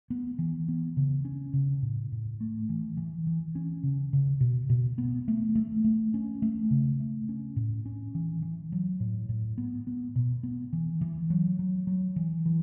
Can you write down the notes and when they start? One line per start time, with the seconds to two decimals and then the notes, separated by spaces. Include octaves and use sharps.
0.10 B3
0.39 E3
0.68 B3
0.97 C#3
1.25 C#4
1.53 C#3
1.82 A2
2.12 A2
2.41 A3
2.69 E3
2.97 E3
3.27 E3
3.55 C#4
3.83 C#3
4.13 C#3
4.41 B2
4.70 B2
4.98 B3
5.28 A3
5.55 A3
5.84 A3
6.14 C#4
6.42 A3
6.71 C#3
7.00 A3
7.29 C#4
7.56 A2
7.86 C#4
8.15 E3
8.42 E3
8.72 F#3
9.00 A2
9.29 A2
9.58 B3
9.87 B3
10.16 B2
10.43 B3
10.73 E3
11.01 E3
11.30 F#3
11.59 F#3
11.87 F#3
12.16 E3
12.46 E3